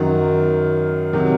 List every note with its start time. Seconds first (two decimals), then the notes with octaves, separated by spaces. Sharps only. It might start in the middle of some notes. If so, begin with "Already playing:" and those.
Already playing: F#2 D#3 F#3
1.13 C3 D#3 F#3